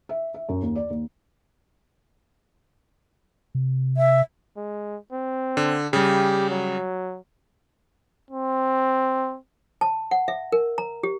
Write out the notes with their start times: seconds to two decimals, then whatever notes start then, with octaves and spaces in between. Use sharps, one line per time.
0.09 E5
0.34 E5
0.49 F#2
0.62 D#2
0.76 D5
0.90 D#2
3.55 C3
3.97 E5
4.57 G#3
5.12 C4
5.57 D3
5.93 C#3 G3 G4
6.50 F#3
8.31 C4
9.81 A5
10.11 F#5
10.28 E5
10.52 A#4
10.78 A#5
11.03 G4